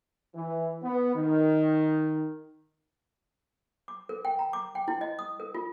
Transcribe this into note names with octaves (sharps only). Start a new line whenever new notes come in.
E3
B3
D#3
D6
A#4
G5
A#5
D6
G5
E4
D#5
D#6
A#4
F4